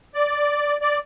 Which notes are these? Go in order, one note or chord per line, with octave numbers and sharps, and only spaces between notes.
D5
D5